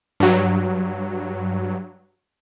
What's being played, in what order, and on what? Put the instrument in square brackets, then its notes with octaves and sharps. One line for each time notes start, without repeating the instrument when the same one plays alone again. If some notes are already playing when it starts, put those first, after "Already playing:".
[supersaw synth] G2 F#3